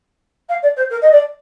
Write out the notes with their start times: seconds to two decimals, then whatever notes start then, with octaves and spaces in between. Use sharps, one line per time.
0.49 F5
0.63 D5
0.76 C5
0.90 A#4
1.02 D#5
1.12 D5